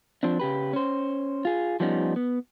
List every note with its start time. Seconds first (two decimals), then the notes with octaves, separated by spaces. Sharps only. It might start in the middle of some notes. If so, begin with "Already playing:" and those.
0.23 F3 C4 D4
0.39 C#3 G4 B4
0.73 C#4 C5
1.45 F4 G#4
1.80 F3 G3 B3 C#4 D#4
2.16 B3